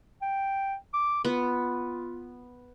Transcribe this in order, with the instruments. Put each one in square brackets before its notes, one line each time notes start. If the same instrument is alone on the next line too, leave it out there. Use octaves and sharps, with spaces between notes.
[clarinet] G5
D6
[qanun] B3 [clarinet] F4